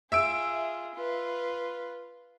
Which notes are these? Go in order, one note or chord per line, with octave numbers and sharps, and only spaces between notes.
F4 G#4 E5 E6 D7
F4 B4